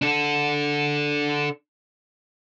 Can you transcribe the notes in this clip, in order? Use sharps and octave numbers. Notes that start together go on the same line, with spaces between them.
D4 A4